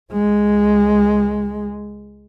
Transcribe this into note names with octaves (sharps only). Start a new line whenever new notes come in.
C#2 G#3